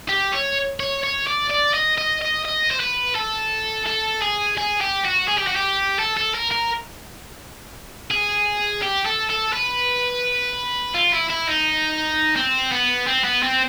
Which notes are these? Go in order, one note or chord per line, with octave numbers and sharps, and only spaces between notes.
G4
C#5
C#5
C#5
D5
D5
D#5
D#5
D#5
D#5
C5
B4
A4
A4
G#4
G#4
G4
F#4
G#4
G4
F#4
G4
A4
A4
A#4
A#4
G#4
G4
A4
A4
B4
F4
E4
E4
D#4
C4
B3
C4
B3
C4